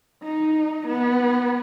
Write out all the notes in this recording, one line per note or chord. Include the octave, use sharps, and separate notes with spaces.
D#4
B3